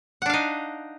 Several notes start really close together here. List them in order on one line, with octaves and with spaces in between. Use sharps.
F#5 D4 F5 D#4